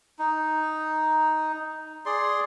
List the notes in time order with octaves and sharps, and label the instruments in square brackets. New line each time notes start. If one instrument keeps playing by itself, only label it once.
[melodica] D#4
G#4 D5 C6